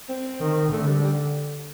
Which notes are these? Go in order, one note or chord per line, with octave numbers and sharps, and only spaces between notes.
C4
D#3
D3 A3
G3
G3